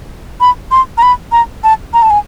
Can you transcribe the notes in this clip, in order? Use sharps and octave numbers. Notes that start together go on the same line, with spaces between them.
B5
C6
A#5
B5
A#5
A5
A#5
A5
G#5